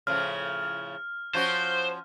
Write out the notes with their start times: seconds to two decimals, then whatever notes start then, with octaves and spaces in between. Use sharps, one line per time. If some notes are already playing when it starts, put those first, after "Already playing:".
0.07 A2 C#3 F3 F6
1.34 F3 C#4 F#4 C5 G6